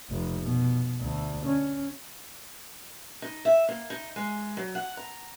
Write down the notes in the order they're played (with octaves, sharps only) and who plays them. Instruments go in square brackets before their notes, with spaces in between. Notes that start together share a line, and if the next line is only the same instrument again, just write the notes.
[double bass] F1
B2
D2
C#4
[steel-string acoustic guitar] D#4
E5
A#3
D#4
G#3
F#3
F#5
A#5